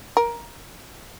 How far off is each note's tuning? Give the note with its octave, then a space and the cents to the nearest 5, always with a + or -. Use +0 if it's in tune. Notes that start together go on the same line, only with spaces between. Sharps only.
A#4 +15